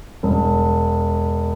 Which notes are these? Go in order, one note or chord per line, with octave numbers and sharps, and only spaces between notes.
E1